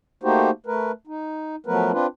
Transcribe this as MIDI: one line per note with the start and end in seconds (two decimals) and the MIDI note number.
0.23 0.50 57
0.23 0.50 58
0.23 0.50 63
0.23 0.50 66
0.23 0.50 67
0.23 0.50 72
0.66 0.92 57
0.66 0.92 70
0.66 0.92 71
1.07 1.56 63
1.66 1.92 53
1.66 1.92 54
1.66 1.92 57
1.66 1.92 59
1.66 1.92 70
1.66 1.92 71
1.92 2.07 60
1.92 2.07 62
1.92 2.07 65
1.92 2.07 71